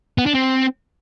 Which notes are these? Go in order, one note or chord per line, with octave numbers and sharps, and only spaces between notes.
B3
D4
C4